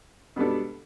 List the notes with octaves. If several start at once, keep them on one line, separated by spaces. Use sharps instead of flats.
B2 G3 B3 D4 A4